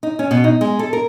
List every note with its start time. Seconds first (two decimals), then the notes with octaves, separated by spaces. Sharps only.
0.03 D#4
0.19 C#4
0.31 B2
0.44 D#4
0.61 G#3
0.79 A4
0.93 A#4